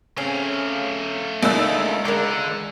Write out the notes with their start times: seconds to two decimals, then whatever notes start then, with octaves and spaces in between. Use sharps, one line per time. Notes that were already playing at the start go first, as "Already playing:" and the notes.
0.17 C#3 A3 C4 C#4 F5
1.43 C#2 A#3 D4 D#4 E6
2.05 D3 G#3 D4 A#4